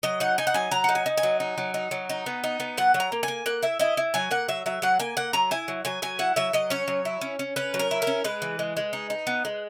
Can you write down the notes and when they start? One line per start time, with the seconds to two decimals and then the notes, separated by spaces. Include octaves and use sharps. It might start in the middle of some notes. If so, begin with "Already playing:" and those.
0.03 F#3 D#5
0.20 D#4 F#5
0.38 D#4 G#5
0.47 F#5
0.54 F#3 G#5
0.71 F#3 A#5
0.84 D#4 F#5
0.95 G#5
1.06 D#4
1.17 G#5
1.23 F#3
1.40 D#4
1.58 F#3
1.74 D#4
1.91 F#3
2.09 D#4
2.26 B3
2.44 D#4
2.60 B3
2.77 F#3 F#5
2.94 F#3
3.00 A#5
3.12 A#3
3.23 G#5
3.28 A#3
3.46 A#3 F#5
3.62 E4 E5
3.79 E4 D#5
3.97 E4
4.14 F#3 G#5
4.31 A#3 F#5
4.48 F#3 E5
4.66 F#3 E5
4.82 F#3 F#5
4.99 A#3 G#5
5.17 A#3 F#5
5.33 F#3 A#5
5.51 E4 G#5
5.68 F#3
5.85 F#3 G#5
6.02 F#3 G#5
6.19 E4 F#5
6.36 F#3 E5
6.53 F#3 D#5
6.70 C#4 C#5
6.88 F#3
7.05 E4
7.21 C#4
7.39 C#4
7.56 C#4 B4
7.74 F#3
7.79 A#4
7.91 E4
8.02 A#4
8.07 C#4
8.24 G#3 B4
8.42 E3
8.59 G#3
8.77 G#3
8.93 D#4
9.10 D#4
9.27 B3
9.45 G#3